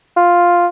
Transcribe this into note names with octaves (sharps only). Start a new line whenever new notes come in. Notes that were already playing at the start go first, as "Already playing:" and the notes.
F4